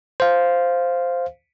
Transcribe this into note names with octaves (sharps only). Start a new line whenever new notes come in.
C5 F5